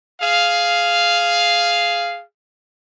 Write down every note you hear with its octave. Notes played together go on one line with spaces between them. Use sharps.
G#4 F5